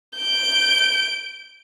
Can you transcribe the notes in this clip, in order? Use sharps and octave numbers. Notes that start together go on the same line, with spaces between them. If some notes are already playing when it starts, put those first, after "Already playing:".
G6 D7